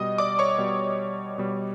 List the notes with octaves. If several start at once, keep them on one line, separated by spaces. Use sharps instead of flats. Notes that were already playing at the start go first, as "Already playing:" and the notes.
Already playing: B2 G3 D#5 D#6
D5 D6
C#5 C#6
B2 G3
B2 G3